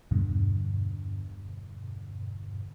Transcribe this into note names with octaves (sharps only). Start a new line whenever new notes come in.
E2 G2 B2 D3